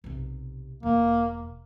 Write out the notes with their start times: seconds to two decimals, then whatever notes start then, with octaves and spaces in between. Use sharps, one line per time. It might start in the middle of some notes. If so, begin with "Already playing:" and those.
0.04 B1 C3
0.83 E1 A#3